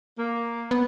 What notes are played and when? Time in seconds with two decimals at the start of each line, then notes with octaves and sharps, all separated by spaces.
0.19 A#3
0.71 B3